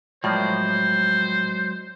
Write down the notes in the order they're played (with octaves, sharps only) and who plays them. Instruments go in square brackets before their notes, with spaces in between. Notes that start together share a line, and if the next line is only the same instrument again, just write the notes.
[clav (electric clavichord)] A2 F3 A#3 [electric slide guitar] F#3 G#3 D5 [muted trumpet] C5